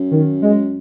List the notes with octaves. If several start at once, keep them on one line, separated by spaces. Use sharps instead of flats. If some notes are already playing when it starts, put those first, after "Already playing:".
Already playing: F#2
D#3
G#3